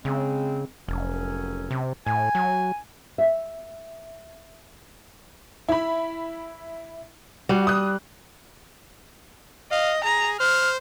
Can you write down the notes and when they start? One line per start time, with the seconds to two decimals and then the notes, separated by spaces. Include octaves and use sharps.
0.05 C#3 G#3 C4
0.88 F1 F#2 F#3 C#4
1.71 C3
2.06 A2 G#5
2.35 F#3
3.18 E5
5.69 E4 B5
7.49 G3 F#4
7.67 D#6 F#6
9.72 D#5 F5
10.04 G#4 A#5
10.40 C5 F6